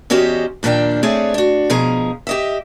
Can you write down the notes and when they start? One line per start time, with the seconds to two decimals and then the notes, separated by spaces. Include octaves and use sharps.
0.10 E2 C#4 F#4 G4 C5 D#5
0.63 D#2 A#2 F3 D4 G5
1.03 A3 C4 G#4 B4 C#5 D5
1.34 D4 F#4
1.70 B2 F3 G#4 A#5
2.27 G4 D#5 E5